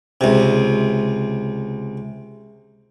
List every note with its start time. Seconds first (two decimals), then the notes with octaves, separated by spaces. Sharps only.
0.21 C#2 C3